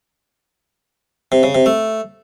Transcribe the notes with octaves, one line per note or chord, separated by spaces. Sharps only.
C3
C#3
C3
A3